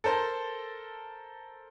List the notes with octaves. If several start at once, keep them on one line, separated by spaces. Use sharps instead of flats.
A4 A#4 C5